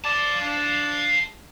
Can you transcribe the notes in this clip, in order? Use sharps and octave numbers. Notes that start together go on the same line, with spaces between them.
D5 F5 A5
D4